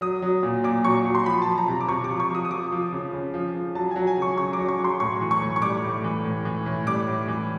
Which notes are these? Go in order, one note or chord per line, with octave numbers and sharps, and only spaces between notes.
F#3 D#6
F#3
A#2
A#2 D6
F#3 C#6
F#3
C6
F3 B5
A5
F3
A#5
C3
D6
C3 C#6
D6
F3
C#6
F3 D#6
D#6
F3 D6
F3
C#3
C#3
F3
F3
F#3 A5
G#5
F#3
G#5
C#3 C#6
C#3 C#6
D6
F#3
C#6
F#3
C6
A2 C#6
E3
C#6
A2
C#6
G3 D6
A2
E3
A2
E3
A2
G3 D6
A2
E3